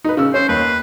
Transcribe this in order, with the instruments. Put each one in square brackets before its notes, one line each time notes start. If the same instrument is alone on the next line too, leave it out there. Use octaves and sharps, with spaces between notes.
[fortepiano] D#4 B4
C#3 E6
[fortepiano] C#4 [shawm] C5
[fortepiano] D#2 [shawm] B4